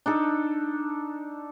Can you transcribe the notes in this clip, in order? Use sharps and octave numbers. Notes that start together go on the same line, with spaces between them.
D4 D#4 A4